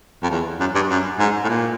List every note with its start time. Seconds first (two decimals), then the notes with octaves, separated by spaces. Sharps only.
0.23 F2
0.30 E2
0.60 F#2
0.75 G2
0.89 F#2
1.19 G#2
1.44 A2
1.49 A#2